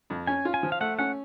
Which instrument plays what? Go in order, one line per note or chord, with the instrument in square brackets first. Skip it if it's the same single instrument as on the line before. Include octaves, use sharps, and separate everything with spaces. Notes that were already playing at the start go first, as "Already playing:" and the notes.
[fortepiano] F2
[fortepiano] C#4 [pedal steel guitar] G#5
[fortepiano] F4
[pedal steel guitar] G#5
[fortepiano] F3
[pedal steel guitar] F5
[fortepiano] A3 [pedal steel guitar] F#5
[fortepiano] C#4 [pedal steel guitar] F#5